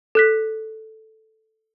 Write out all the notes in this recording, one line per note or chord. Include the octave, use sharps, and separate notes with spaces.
A4 F#6 B6